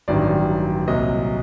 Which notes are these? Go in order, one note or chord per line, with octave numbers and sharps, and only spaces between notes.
A1 G2 D#3 F#3 D5
C2 A#2 F#3 D#5